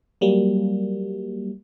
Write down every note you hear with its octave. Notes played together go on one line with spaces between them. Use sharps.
F#3 G3 A#3